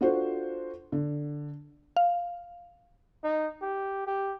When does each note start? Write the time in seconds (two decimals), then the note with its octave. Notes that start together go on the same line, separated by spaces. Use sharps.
0.01 D4 F4 F#4 A4 C5
0.92 D3
1.97 F5
3.24 D#4
3.62 G4
4.07 G4